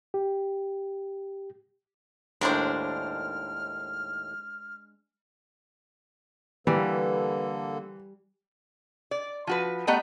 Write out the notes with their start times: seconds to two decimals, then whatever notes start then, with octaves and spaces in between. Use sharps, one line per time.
0.14 G4
2.41 D#2 A2 G#3 D4 A#4 C5 F6
6.67 D3 E3 G3 A#3 A4 B4
9.11 D5
9.47 F3 F#4 B4
9.87 G3 A3 B3 D#5 F#5 A#5